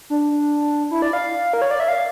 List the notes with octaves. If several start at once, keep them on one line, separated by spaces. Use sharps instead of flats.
D4
E4
D5
F5
A#4
C#5
D5
E5
F5